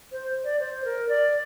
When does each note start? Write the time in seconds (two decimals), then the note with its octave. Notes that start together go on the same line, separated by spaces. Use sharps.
0.12 C5
0.44 D5
0.60 C5
0.85 A#4
1.09 D5